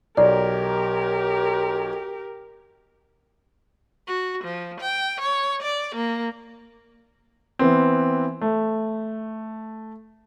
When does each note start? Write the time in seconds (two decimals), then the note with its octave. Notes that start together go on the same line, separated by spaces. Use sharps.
0.17 B1 G4 A#4 D5
4.07 F#4
4.44 F3
4.81 G5
5.21 C#5
5.63 D5
5.95 A#3
7.59 E3 B3 C4
8.41 A3